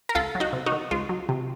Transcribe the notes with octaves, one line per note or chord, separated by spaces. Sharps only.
A#4
C#2 F4 A4
F#3
D#4 F#4
C3
D#4 F#4
D#3
C#2 F4
F#3
C3